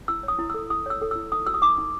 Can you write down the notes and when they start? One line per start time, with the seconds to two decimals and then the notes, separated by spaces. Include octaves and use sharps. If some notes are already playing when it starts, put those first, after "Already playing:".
0.08 E4 E6
0.23 C#5
0.28 D#6
0.39 E4
0.50 E6
0.54 A4
0.70 E4 D#6
0.86 C#5 E6
1.01 A4
1.11 E6
1.16 E4
1.32 D#4 D#6
1.47 F#4 E6
1.54 D#6
1.62 D#4 D6
1.78 D#4